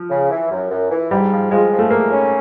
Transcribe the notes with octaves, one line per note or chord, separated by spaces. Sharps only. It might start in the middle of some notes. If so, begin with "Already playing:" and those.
Already playing: F3
C#3
E3
F#2
F#2
E3
G#2 G3
F3
F3 G#3
F3
A3
G#2 A#3
C#4